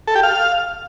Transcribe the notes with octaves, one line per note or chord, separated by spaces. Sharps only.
A4
G4
F5